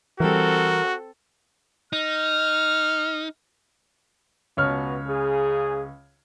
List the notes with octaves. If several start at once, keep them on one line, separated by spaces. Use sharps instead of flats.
E3 G3 C4 F#4 A4 A#4
D#4 F6
C#2 B2 C#5 F6
C#3 G#4